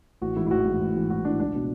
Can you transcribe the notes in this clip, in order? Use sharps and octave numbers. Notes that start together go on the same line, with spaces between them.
A1 F#4
G#2 E3 E4
E4
A1 F#4
G#2 E3
A1
G#2 E3
A1 F#4
G#2 E3 D4
C#2 D4
B2